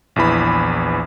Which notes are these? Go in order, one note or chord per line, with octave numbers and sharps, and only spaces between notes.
A#1 E2 E3 B5